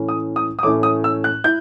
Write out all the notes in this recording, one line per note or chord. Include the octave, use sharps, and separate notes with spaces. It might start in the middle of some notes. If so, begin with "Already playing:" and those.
Already playing: A2 E3 A3 C#4 E4
D#6
D#6
D#6
A2 E3 A3 C#4 E4 D6
D#6
E6
F#6
E4 G6